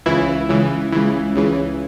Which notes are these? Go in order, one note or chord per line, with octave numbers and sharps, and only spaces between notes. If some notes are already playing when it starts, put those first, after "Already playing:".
C#2 C#3 E3 E4
C#2 C#3 E3
C#2 C#3 E3
C#2 C#3 E3